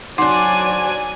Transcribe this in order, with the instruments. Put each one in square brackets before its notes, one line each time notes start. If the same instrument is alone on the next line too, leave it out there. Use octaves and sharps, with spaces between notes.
[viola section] F#3 D5 G#5 [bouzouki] D4 C5 [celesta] D#4 F#5 D6